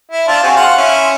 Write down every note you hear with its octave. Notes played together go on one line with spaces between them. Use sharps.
E4
D4 F4 C5
C4 F#4 G#4
F5 F#5 C6
C#4 E4